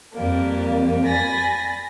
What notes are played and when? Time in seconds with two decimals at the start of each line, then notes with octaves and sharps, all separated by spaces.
0.13 F2 G3 A#3
1.04 G#5 B5 A6 A#6